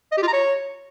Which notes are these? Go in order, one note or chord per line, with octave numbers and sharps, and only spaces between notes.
D#5
G4
F4
A#5
C#5